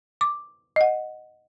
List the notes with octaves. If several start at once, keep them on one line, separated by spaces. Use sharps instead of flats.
D6
D#5 F#5